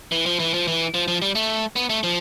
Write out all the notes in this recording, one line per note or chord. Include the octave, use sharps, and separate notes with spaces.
E3
F3
E3
F3
E3
F3
F3
G3
A3
B3
A3
F3